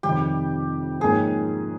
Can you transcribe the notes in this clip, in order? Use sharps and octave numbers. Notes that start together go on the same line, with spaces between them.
F2 C3 D#3 G3 G4
G#2 F3 A#3 C#4 G#4